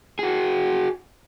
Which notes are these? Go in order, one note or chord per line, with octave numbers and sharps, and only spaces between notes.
F#4 G#4